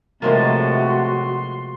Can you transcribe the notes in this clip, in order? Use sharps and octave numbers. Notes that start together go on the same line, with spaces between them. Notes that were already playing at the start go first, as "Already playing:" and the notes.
A2 C3 F3 G#3 A#3 F#4 A5
C6